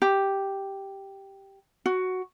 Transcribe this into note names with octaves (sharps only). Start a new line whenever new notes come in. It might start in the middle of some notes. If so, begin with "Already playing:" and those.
G4
F#4